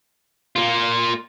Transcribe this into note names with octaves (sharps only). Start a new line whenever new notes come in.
A#3 F4